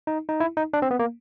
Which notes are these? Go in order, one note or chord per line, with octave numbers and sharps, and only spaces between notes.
D#4
D#4
E4
D#4
D4
C4
B3
A#3